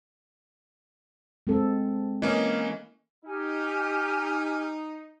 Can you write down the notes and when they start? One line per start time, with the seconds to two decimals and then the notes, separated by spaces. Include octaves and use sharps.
1.47 G#3 C4 A4
2.22 E3 A#3 C#4 D#5
3.25 D#4 G4 G#5 F6